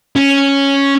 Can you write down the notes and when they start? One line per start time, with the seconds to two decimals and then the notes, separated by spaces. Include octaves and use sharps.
0.16 C#4